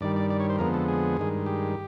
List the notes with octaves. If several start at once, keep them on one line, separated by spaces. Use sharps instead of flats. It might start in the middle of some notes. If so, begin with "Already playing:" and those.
G2 D#3 G3 D5
D5
D5
C#5
C5
F2 D3 F3 G#3 B3 A#4
A4
G#4
G2 D#3 G#3
G4